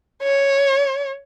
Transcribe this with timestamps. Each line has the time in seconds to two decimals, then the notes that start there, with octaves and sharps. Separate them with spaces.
0.23 C#5